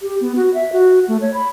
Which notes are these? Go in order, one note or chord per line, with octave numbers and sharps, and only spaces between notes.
G4
B3
F#4
E5
F#4
A3
C#5
B5